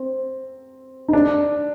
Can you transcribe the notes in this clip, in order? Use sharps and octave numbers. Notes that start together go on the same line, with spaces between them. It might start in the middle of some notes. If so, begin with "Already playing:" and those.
Already playing: C4
D#4
D4